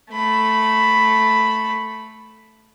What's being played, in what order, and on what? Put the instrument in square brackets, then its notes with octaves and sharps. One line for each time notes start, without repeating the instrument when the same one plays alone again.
[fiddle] A3 B5